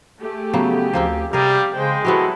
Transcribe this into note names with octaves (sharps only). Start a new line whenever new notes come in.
A3 G4 G#4
C#3 F#3 B3
D2 F3 A#3 C4
C3 G3 G4 G#4 A#4 F5
C#3 G#3 C5 G5
F#3 B3 C4 E4 F#4 G4 A4